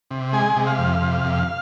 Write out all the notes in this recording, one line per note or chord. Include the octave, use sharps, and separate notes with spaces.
C3
G#3 G#5
C3
F5
F2
C3
F2